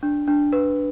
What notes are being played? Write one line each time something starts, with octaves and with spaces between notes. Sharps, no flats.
D4
D4
B4